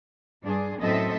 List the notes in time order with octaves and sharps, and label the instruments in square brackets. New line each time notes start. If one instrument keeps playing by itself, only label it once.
[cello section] G2 D4 G#4
F#2 A2 C4 A4 D#5 E5